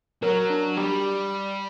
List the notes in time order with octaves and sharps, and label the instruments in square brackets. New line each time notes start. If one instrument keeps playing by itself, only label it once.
[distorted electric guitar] F#3 [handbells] A#4
[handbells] D4
[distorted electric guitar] G3 [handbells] G4